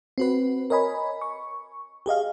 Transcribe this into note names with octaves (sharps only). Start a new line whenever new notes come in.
C4 F#4 B4
A#4 C#5 D#5 G#5 B5
C#6
G4 G#4 D#5 F5